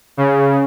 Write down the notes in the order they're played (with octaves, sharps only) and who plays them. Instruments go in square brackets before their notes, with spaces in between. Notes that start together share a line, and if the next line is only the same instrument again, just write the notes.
[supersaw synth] C#3